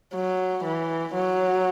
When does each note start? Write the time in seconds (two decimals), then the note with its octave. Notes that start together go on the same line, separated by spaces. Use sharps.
0.14 F#3
0.64 E3
1.15 F#3